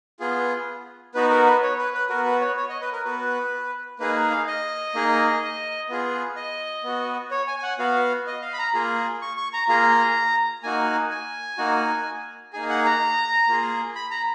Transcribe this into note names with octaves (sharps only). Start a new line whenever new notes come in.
B3 F4 G#4
B3 D#4 F#4 B4
A#4
B4
C#5
B4
B4
B3 F#4 A#4
B4
C#5
C#5
D#5
B4
A#4
B3 F#4 B4
A#3 D#4 G#4 B4
F5
D#5
A#3 D#4 G#4
B3 F4 G#4
D#5
B3 F#4
C#5
G#5
G#5
F#5
B3 F#4 F5
D#5
F5
B5
A#5
A#3 F4 G#4
C#6
C#6
A#5
A#3 F4 G#4 A#5
A#3 D#4 F#4 G#5
G#5
A#3 D#4 F#4
A#3 D#4 G#4 G#5
F#5
A#5
A#3 F4 G#4
B5
A#5